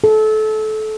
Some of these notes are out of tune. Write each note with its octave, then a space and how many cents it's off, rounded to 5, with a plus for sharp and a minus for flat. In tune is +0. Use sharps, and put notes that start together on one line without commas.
A4 -25